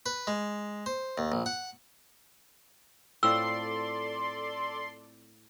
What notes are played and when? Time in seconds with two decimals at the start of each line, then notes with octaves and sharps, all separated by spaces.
0.06 B4
0.27 G#3
0.86 C5
1.18 D#2
1.32 A#1
1.46 F#5
3.23 A2 C4 F4 A4 D5 C6 E6